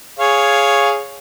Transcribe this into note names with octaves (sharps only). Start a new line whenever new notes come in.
G#4 C#5 F5